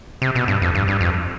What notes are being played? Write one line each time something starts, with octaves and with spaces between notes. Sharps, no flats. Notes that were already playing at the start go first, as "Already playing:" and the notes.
C3
B2
G2
F2
G2
G2
F2